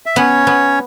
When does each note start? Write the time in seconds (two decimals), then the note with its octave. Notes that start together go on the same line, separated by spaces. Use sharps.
0.06 E5
0.16 B3 C#4 C#5
0.47 B3